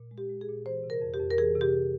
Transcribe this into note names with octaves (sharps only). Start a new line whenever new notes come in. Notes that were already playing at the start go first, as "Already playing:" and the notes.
Already playing: A#2
G#3
G4
G#3
G#4
A#2
E3 C5
C3
A#4
F2
G4
F2
A#4
E3 G#4
C3
G4